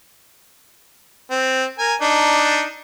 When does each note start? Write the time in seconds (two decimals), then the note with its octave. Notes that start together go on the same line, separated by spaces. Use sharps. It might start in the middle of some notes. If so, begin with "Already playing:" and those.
1.31 C4
1.79 A#4 G#5
2.01 D4 D#4